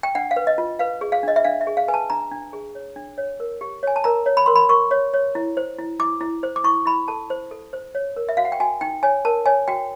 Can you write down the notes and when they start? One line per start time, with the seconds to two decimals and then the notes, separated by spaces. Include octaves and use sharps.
0.03 G5
0.15 D4 F#5
0.31 F5
0.36 B4
0.47 D#5
0.58 F4
0.79 B4 F5
1.01 G#4
1.12 F5
1.23 D4 D#5
1.36 E5
1.44 D4 F5
1.61 E5
1.67 G#4
1.77 F5
1.88 B4 G#5
1.94 A5
2.10 D4 A#5
2.31 D4
2.53 G#4
2.75 C#5
2.96 D4
3.18 C#5
3.40 A#4
3.61 G4
3.83 C#5 G#5
3.96 A5
4.04 A#4 A#5
4.26 C#5
4.37 B5
4.46 A#4 C6
4.56 B5
4.69 A#4 C#6
4.91 C#5
5.14 C#5
5.35 E4
5.57 C5
5.79 E4
5.99 E4 D6
6.21 E4
6.43 C5
6.56 D6
6.64 E4 C#6
6.86 E4 B5
7.08 A4 A5
7.30 C5
7.51 A4
7.73 C5
7.95 C#5
8.16 A#4
8.29 E5
8.37 F#4 F5
8.45 F#5
8.52 G5
8.60 F#4 G#5
8.81 D#4 G5
9.03 C#5 G#5
9.25 A#4 A5
9.46 C#5 G#5
9.68 F#4 G5